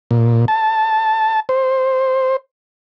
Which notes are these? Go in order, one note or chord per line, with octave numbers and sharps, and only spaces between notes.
A#2
A5
C5